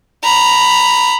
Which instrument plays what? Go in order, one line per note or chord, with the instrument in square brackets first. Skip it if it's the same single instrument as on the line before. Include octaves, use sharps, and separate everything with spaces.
[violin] A#5 B5